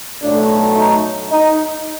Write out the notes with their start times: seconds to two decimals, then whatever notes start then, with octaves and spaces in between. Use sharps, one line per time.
0.21 B1 A2 F#3 A3 D4
0.77 D#4
1.32 D#4